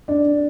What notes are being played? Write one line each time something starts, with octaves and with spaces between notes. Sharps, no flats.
D4